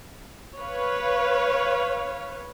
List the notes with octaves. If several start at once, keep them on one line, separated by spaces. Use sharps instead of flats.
B4 C#5 F5